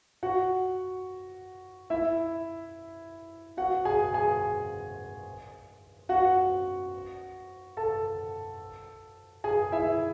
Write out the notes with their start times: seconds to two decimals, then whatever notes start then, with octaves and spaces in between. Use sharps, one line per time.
0.23 F#4 F#5
1.90 E4 E5
3.57 F#4 F#5
3.85 G#4 G#5
4.14 G#4 G#5
6.09 F#4 F#5
7.77 A4 A5
9.44 G#4 G#5
9.72 E4 E5